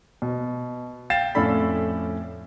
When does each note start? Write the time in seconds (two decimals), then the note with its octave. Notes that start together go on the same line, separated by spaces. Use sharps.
0.22 B2
1.10 F5 G5 A6 C7 E7
1.35 F2 A2 C#4 A4 D5 B5